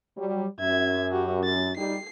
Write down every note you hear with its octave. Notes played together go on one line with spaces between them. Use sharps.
F#3 G3
F#2 E5 G#6
F#4 G4
A6
G3 D#4 G4 C7